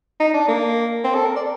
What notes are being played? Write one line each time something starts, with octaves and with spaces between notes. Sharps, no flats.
D#4
D4
A#3
C4
A4
A#4
D5